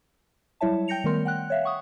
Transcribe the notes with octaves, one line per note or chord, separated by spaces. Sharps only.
F#3 G3 E4 C#5 E5 A5
G5 G6 A#6 C#7 F7
D#3 G3 A3 B3 A#4 C6
F#5 G5 F#6
C#5 E5 F5
F#5 C#6 D#6